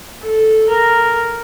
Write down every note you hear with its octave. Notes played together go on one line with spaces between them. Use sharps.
A4
A#4